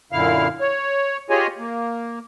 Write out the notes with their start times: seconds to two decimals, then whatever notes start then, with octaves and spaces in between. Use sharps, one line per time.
0.12 F#2 A#2 D3 E4 F5 F6
0.61 C#5
1.30 F4 G4 G#4 C#5 D#5 G#5
1.58 A#3